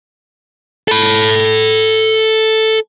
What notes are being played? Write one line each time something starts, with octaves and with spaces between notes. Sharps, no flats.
A4 B5